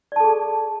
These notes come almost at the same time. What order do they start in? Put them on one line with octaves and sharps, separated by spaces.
D5 A5 A4 G#4